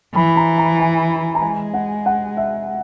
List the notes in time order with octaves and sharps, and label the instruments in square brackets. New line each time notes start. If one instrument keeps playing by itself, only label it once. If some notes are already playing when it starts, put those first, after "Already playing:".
[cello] E3 [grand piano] B5
[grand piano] A#5
A#5
G#5
A#5
[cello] G#3 [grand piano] G#5
[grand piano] F#5
F#5
E5